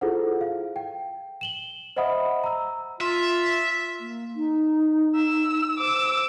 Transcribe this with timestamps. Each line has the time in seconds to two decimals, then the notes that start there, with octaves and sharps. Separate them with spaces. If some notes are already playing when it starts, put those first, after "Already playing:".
0.01 E4 F4 G#4 A4 C5 F#5
0.41 F5
0.76 G5
1.41 E7 F#7 G7
1.96 C5 D#5 E5 F#5 B5 D#6
2.44 A#5 E6
3.01 F4 E5
4.00 A#3
4.36 D#4
5.15 E6
5.78 C5 D6 E6